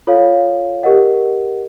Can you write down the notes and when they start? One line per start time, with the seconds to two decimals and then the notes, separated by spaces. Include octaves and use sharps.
0.07 F4 A4 C#5 F5
0.83 G4 A#4 D#5 F#5